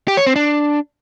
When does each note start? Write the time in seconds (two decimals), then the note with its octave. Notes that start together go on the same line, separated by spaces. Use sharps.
0.08 G4
0.17 C#5
0.26 C4
0.36 D4